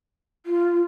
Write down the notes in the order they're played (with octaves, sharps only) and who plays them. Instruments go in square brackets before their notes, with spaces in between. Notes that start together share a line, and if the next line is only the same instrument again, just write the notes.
[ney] F4